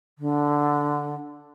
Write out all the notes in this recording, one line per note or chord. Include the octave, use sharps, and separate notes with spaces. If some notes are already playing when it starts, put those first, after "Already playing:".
D3